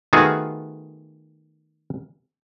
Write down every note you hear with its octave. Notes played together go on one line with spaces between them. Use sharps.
D#3 A3 B3 F4 F#4 G#4